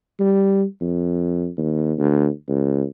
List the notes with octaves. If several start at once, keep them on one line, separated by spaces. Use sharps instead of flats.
G3
F2
D#2
D2
C#2